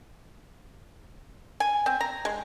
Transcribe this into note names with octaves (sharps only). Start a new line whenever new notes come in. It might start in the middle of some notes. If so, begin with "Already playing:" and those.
G#5
C4
A#5
G#3